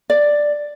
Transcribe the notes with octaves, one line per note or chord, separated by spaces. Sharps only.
D5